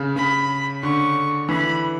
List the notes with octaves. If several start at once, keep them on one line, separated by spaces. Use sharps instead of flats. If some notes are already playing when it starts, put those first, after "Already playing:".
Already playing: C#3
C#3 B5
D3 C#6
E3 B5